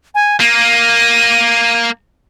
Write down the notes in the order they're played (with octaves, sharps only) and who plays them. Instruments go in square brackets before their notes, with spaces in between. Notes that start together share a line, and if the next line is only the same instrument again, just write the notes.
[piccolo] G#5
[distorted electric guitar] A#3 [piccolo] D#7